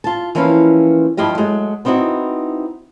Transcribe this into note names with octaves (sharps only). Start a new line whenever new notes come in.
F4 A5
E3 F3 A#3 C#4 B4 F5
G2 F3 E4 F4 G4 D#5
F#3 G#3 A3
B3 C4 D#4 E4 F#4